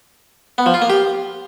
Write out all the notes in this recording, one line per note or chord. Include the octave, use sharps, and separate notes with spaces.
B3
F3
F4
A#3
G4